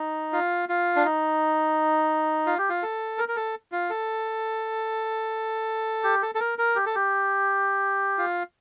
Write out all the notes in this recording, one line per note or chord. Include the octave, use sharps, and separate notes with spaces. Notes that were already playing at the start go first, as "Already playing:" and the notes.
Already playing: D#4
F4
F4
D4
D#4
F4
G4
F4
A4
A#4
A#4
A4
F4
A4
G4
A4
A4
A#4
A#4
G4
A4
G4
F4